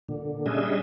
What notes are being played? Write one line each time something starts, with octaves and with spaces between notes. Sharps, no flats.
A#2 D3
G3 C#4 D4 G#4 D#5 E5